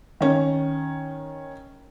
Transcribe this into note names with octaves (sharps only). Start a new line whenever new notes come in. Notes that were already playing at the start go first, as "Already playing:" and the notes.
D#3 C#4